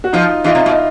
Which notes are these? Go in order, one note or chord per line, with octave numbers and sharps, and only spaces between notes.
F#4
F3 D#4 F4
E3 D#4 F4
C3
B2